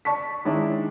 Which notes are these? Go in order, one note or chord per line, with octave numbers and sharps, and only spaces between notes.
D5 A5 C#6 B6
D#3 G#3 C#4 D4 E4